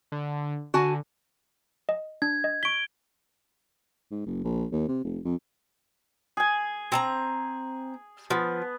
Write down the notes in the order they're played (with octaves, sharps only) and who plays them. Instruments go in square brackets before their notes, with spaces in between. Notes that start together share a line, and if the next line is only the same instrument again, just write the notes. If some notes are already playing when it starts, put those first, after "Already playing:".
[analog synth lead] D3
[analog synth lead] D3 [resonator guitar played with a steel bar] F#4 G#5 A5
[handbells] D#5
[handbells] D4 [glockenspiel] G#6
[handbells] D#5
[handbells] C#6 B6 [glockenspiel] D7 G7
[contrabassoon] G#2
F#1
A#1
D#2
C3
F1
F2
[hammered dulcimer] G#4 G#5
[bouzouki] C4 A5 A#5
[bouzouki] F3 [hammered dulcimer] B3